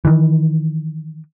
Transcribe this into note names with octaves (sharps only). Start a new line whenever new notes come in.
D#3 E3